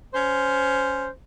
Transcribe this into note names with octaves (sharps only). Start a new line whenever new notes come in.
C#4 C5